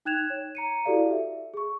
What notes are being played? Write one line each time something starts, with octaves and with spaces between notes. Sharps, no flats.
D#4 G5 F#6 G#6 E7 F7
C#5
A#5 C#7 D#7
E4 F#4 G4 A4 D5 F5
E5
G#4 C#6